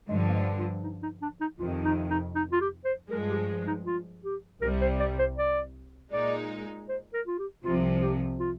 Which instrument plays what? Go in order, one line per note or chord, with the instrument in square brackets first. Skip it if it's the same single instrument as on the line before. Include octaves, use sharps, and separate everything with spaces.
[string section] G2 D3 F3 [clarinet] G#3
[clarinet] A#3
G#3
F4
D#4
D#4
D4
D#4
[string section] F2 C3 D#3 [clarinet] F4
[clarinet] D#4
D#4
D#4
F4
G4
C5
[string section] G2 F3 G#3 [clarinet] A#4
[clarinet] G4
D#4
F4
G4
[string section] C2 C3 G3 [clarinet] A#4
[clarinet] C5
D5
C5
D5
[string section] A#2 G#3 D#4 [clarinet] D5
[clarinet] C5
A#4
F4
G4
[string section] C2 C3 F3 [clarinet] F4
[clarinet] G4
F4